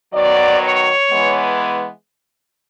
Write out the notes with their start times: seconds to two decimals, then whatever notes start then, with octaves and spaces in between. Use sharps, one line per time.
0.13 D#3 F#3 B3 D5
0.62 C#5
1.11 E3 G#3 B3